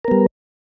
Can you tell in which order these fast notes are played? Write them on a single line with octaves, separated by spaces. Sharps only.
A#4 B3 G3